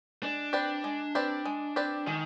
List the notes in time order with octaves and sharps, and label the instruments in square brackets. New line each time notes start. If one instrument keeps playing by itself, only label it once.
[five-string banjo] G#3 [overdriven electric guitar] D4
[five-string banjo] C4 G4 B4 D5
G#3
C4 G4 B4 D5
G#3
C4 G4 B4 D5
[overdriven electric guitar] D#3 [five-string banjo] G#3